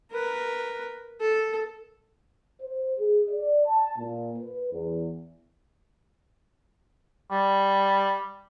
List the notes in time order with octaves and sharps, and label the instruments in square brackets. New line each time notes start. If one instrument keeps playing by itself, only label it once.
[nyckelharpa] A#4 B4
A4
[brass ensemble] C5
G#4
D5
A5
A#2
B4
E2
[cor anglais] G3